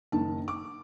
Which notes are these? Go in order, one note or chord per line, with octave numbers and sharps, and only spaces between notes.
F#1 D#3 A5
D6